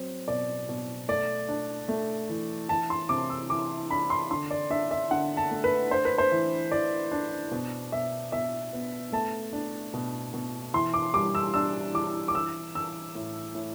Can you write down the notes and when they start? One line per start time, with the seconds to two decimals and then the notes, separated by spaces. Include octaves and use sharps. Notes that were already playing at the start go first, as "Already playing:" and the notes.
Already playing: F#3 C4
0.28 B2 D5
0.69 B2
1.08 A3 D5
1.49 D4
1.88 A3
2.29 E3
2.69 E3 A5
2.90 C6
3.09 C3 D6
3.30 E6
3.50 E3 D6
3.90 D4 B5
4.10 C6
4.31 D3 C6
4.51 D5
4.70 D4 E5
4.91 E5
5.11 D3 F#5
5.37 A5
5.51 A3
5.64 B4
5.91 D4 C5
6.05 B4
6.18 C5
6.31 E3
6.72 E3 D5
7.12 D4
7.51 B2
7.92 B2 E5
8.32 B2 E5
8.73 B3
9.12 A3 A5
9.53 D4
9.94 B2
10.34 B2
10.74 E3 C6
10.94 D6
11.14 G3 D6
11.35 E6
11.54 D4 E6
11.94 E3 D6
12.28 D6
12.34 E3 E6
12.75 E3 E6
13.15 A2
13.55 A2